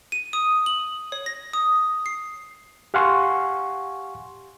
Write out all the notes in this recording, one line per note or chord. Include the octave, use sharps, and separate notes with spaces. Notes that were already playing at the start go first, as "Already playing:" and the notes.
D#7
D#6
F#7
C#5
A#6
D#6
C7
G4 F5 F#5 G#5 C6 C#6